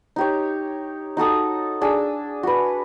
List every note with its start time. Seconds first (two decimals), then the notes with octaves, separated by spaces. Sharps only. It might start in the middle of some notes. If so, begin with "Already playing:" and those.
0.16 D#4 G4 C#5
1.17 D#4 F#4 A4 D#6
1.81 D4 G#4 E6
2.43 F#4 B4